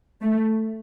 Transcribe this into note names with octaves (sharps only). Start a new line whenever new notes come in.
A3